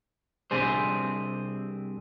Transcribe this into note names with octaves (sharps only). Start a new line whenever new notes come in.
C2 C3 C4 D4 G#4 C5